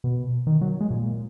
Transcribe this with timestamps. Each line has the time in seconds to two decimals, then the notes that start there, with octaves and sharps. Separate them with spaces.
0.04 B2
0.47 D#3
0.61 F#3
0.80 G#3
0.90 A#2